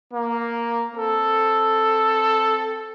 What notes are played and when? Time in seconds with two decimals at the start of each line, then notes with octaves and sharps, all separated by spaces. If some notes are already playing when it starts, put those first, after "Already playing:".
0.13 A#3
0.95 C4 A4